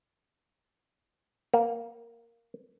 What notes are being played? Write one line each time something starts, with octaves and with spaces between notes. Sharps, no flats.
A#3